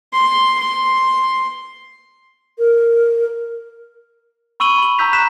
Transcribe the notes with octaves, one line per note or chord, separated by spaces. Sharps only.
C6
C6
A#4
B5 C#6 E6 D#7 F#7 G7
B5 F#7
A#5 B5 E6 G6 B6 F7
A#5 F#6 B6 E7